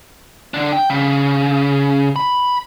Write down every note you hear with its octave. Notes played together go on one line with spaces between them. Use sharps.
D3 D4
G5
C#3
B5